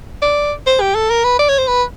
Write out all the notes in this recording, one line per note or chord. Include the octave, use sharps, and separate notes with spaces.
D5
C5
G4
A4
A#4
B4
D5
C#5
C5
B4